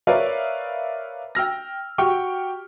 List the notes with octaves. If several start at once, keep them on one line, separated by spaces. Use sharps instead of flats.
A#4 B4 C#5 D5 E5 F5
G5 E6 F6 A#6
F#4 G4 G5 C#6 F6